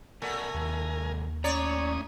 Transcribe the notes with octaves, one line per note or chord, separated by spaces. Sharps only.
B2 A3 A#4 D5 F#5 G#5
D#2 C3 D#3
A2 C#4 C#5 D5 A#5 D#6